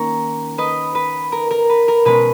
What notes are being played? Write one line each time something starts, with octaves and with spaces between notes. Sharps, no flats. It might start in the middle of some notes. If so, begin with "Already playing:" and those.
Already playing: D#3 A#3 C#4 A#5 C#6
B4 D#5
B4
A#4
A#4
B4
A#4
B2 G#3 C#4 B4